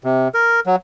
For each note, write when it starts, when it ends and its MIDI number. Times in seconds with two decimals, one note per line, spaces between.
0.04 0.28 48
0.34 0.60 70
0.66 0.76 54